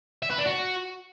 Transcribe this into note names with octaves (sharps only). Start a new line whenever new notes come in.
E5
B4
D4
F#4